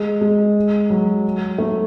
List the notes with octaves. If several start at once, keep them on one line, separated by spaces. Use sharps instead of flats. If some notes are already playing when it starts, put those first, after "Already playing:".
Already playing: G#3
G#3
F#3
A3